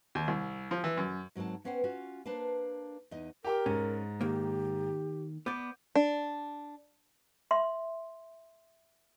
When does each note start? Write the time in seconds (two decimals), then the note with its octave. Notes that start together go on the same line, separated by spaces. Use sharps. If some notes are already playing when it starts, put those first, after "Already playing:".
0.15 D#2
0.28 C2
0.71 F3
0.84 E3
0.97 F#2
1.35 G#2 F#3 C4 A#4 A5
1.64 B3 C#4 B4 C5 F#5 G5
1.84 C#4 F4 F#4
2.26 A#3 D4 B4 C5 A5
3.11 E2 D#4 D#5
3.44 G4 A#4 G5 D6
3.66 G#2 C#4
4.21 D#3 A#3 G4
5.46 B3 D5 D6 G6
5.95 D4
7.51 E5 C6